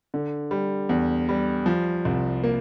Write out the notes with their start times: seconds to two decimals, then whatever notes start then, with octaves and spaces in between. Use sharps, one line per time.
0.14 D3
0.51 G3
0.89 E2
1.29 G3
1.66 F3
2.05 C2
2.44 A#3